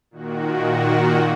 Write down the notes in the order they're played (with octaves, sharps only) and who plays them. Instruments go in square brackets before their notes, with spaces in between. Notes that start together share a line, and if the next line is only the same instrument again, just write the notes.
[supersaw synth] A#2 D#3 F#4